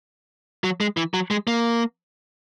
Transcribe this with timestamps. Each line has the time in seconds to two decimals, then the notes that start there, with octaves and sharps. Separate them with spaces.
0.64 F#3
0.81 G#3
0.97 E3
1.14 F#3
1.31 G#3
1.47 A#3